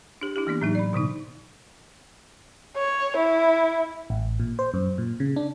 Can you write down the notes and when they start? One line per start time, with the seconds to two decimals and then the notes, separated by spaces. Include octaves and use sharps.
0.21 D4 G4
0.36 D4 E4 G4
0.47 E3 A#3 B3 D4
0.61 A2 F#3 D#4
0.75 D5 B5
0.93 B2 D3 B3 D#4
2.77 C#5
3.17 E4
4.10 A1
4.40 A#2
4.59 C5
4.74 F#2
4.98 A#2
5.20 C#3
5.36 D4